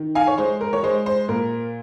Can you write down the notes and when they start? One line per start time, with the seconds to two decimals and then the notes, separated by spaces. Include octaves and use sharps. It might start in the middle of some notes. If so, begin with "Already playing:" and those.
Already playing: D#3
0.15 F5 G#5
0.27 C#5
0.38 G#3 C5
0.61 A#4
0.73 C#5
0.83 G#3 C5
1.06 C5
1.28 A#2 A#4